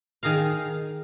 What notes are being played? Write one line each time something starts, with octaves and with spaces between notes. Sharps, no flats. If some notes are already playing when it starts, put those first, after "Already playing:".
D#3 G#4 A#4 F5